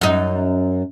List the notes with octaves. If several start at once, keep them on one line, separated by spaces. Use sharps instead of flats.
F#2 D#4